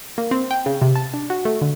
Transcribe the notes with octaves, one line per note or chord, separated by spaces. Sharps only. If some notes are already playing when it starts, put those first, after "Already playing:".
A#3
C4
G5
C#3
C3
A5
D4
F#4
A3
D3